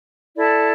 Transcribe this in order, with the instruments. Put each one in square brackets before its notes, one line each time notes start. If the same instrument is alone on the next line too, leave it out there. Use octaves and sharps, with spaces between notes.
[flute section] E4 A4 D5 A5